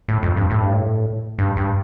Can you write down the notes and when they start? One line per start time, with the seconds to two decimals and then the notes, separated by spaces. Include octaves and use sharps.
0.08 A2
0.23 F2
0.36 G2
0.50 A2
0.62 G2
0.73 A2
1.39 G2
1.57 G2